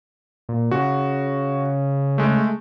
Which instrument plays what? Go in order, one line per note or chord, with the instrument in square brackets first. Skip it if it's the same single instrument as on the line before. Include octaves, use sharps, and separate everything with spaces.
[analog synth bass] A#2
[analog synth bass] C#3 [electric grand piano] F#4
[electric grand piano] G#3 A3